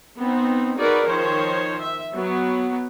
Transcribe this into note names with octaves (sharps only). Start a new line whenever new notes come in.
B3 C4 D#4
D#4 F#4 G#4 A#4 B4 D5
D#3 F3 C5 C#5
E5
F#3 B3